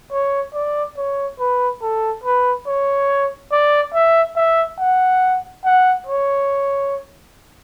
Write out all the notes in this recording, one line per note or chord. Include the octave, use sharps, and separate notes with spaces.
C#5
D5
C#5
B4
A4
B4
C#5
D5
E5
E5
F#5
F#5
C#5